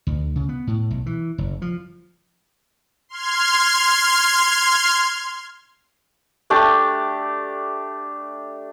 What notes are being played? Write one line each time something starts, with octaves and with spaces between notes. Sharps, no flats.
D2
C#3
B3
A2
B1
E3
F#1
F3
C6 F6 G#6
A3 D4 G4 D5